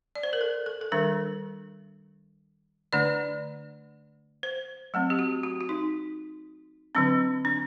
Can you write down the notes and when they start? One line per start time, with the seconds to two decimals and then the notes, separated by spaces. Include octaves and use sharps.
0.15 D5
0.23 C5
0.33 A#4
0.41 A4
0.66 A4
0.81 A4
0.92 D#3 G3 D4 A#4
2.93 D3 A3 D4 D5
4.43 C5
4.94 F#3 A3 C4
5.10 G4
5.19 F#4
5.43 F#4
5.61 F#4
5.69 D#4
6.95 D3 F#3 C4 D4
7.45 D4